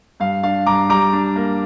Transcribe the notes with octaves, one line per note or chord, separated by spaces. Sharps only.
G2 F5
D4 F5
G2 A#5 D6
G3 A#5 D6
D4
A#3